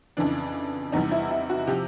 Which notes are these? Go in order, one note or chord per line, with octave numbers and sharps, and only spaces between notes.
F2 C#3 E3 D4
E2 C3 E3 G3 D#4
E4
E4
F#4
C3 F3 G4